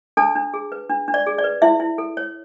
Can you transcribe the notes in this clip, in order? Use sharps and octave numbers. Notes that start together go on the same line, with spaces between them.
D4 A4 A5
D4
G#4
B4
D4
D4
D5
G#4
D5
B4
E4 E5
E4
A4
C#5